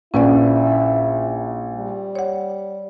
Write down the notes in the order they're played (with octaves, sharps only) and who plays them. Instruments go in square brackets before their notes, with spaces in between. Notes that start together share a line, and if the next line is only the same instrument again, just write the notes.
[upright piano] A#1 [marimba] C#4 B4 D5 [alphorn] E4
[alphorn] G3
[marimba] C#5 F#5